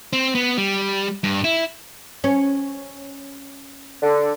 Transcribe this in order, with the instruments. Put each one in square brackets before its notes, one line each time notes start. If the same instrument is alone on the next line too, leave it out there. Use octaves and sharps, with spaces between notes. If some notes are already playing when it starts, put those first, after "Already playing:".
[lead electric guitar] C4
B3
G3
G2
E4
[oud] C#4
[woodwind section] D3